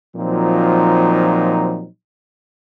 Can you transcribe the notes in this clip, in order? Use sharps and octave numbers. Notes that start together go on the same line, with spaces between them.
A#2 F3 F#3 C4 D#4